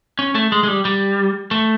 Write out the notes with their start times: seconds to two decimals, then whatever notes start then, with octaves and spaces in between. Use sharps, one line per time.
0.19 C#4
0.35 A3
0.52 G#3
0.64 G#3
0.68 G3
0.85 G3
1.51 A3